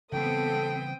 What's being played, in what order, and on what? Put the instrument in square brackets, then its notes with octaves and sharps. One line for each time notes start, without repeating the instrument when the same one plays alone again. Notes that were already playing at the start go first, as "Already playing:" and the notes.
[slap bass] C#3 E3 G3 [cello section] B3 C4 [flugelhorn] A4 [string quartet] G5 D#6